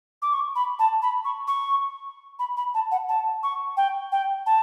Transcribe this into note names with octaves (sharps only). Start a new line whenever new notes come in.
D6
C#6
B5
A5
B5
C#6
C#6
B5
B5
A5
F#5
A5
C#6
G5
G5
A5